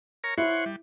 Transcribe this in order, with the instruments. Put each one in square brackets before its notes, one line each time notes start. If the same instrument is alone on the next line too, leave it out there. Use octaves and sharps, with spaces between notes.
[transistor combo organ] A#4 C#5 A#5
[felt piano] E4 [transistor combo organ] C5 C#5 F#5
[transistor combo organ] G3